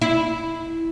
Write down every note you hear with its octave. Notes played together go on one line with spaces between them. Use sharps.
E4